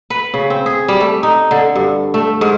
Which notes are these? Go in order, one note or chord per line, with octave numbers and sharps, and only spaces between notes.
B4
C#3
C4
G#4
G3
A3
D#4
D3
G2
A3
G#2